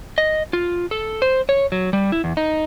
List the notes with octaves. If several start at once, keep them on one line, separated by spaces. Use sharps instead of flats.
D#5
F4
A4
C5
C#5
F#3
G3
E4
E2
D#4